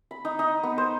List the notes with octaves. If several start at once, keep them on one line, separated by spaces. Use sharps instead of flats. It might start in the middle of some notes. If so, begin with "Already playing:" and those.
B5
D#4
D#4
B3
C5